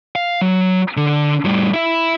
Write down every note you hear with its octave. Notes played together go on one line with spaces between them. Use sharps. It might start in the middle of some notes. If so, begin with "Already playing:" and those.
F5
F#3
D3
A2 G3
E4 E5